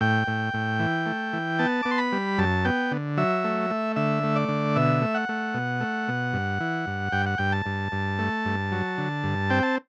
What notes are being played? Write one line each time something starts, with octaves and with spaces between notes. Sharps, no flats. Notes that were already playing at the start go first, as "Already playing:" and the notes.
A2 G5
A2
A2
E3
A3
E3
B3 A5
B3 D6
C6
B5
G3
F#2 A5
B3 G5
D3
F#3 E5
A3
A3
D3 E5
A3
D5
D3
B2 E5
A3
F#5
A3
B2
A3
B2
G2
E3
G2
G2 G5
F#5
G2 G5
A5
G2
G2
A3
G2
F#3
D3
G2
C4 G5
A5